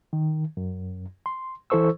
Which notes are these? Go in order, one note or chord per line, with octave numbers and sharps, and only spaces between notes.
D#3
F#2
C6
E3 E4 A4 C5 C#6 E6